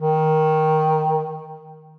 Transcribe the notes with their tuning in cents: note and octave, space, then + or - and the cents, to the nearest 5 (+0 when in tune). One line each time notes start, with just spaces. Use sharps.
D#3 +5